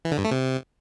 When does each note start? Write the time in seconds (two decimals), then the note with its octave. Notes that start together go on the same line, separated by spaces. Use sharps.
0.05 E3
0.11 D3
0.18 G2
0.25 A3
0.31 C3